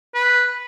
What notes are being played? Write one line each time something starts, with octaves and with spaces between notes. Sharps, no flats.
B4